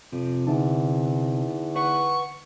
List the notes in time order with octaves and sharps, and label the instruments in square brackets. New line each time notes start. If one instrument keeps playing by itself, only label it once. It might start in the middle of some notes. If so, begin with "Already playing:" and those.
[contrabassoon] F2 [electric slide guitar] C3
[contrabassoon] E2 [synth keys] D3 D#4 A5
[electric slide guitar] B4 F#5 [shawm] C#6